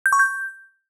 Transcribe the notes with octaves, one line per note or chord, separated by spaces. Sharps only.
G6
C#6
G6